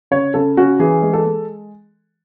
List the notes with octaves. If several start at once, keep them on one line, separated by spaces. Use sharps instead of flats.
C#3 C#5
C#3 A4
C#4 F#4
E3 G#4
G#3
A4
G#3